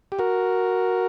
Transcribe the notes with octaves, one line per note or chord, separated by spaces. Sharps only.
G4
F#4 A#4